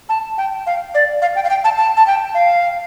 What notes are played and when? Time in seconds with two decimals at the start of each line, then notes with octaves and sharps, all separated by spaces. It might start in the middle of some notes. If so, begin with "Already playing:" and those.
0.09 A5
0.38 G5
0.66 F5
0.95 D5
1.22 F5
1.35 G5
1.44 F5
1.49 G5
1.64 A5
1.78 A5
1.97 A5
2.07 G5
2.34 F5